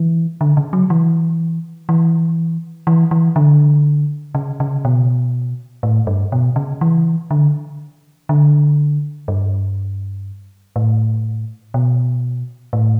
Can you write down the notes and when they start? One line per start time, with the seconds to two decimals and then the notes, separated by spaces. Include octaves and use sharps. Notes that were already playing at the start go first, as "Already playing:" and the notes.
Already playing: E3
0.41 D3
0.57 C#3
0.73 F#3
0.90 E3
1.89 E3
2.87 E3
3.11 E3
3.36 D3
4.35 C#3
4.60 C#3
4.85 B2
5.83 A2
6.07 G2
6.32 B2
6.56 C#3
6.81 E3
7.31 D3
8.29 D3
9.28 G2
10.76 A2
11.74 B2
12.73 A2